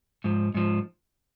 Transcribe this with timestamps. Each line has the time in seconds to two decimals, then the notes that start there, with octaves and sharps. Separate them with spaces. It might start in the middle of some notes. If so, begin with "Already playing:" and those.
0.24 G#2 F3
0.55 G#2 F3